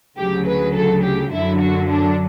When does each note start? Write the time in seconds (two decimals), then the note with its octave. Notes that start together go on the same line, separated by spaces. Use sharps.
0.18 D2 C#3 F#3 G4
0.46 B4
0.75 A4
1.03 G4
1.32 F#2 D3 F#3 E4
1.61 F#4
1.89 D4